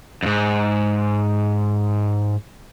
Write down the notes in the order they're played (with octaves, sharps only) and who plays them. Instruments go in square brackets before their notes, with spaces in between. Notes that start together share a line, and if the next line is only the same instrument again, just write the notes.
[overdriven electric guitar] F2 G#2